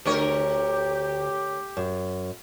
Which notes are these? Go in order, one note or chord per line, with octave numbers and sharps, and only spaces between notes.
D2 D3 G4 A#4 C#5
F#2